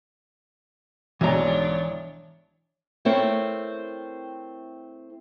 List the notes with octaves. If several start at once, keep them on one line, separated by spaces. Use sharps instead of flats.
B1 G#2 E3 D4 C#5 A#5
A3 C4 E4 A#4 C#5